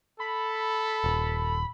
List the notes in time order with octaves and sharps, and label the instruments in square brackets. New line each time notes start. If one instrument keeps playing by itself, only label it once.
[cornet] A4 [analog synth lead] B5
[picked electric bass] D#1